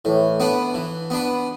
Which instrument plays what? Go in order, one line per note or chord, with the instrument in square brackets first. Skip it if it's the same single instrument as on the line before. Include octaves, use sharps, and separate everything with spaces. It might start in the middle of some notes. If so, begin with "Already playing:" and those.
[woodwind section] A2 [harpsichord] E3
[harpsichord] B3 D4 B4
E3
B3 D4 B4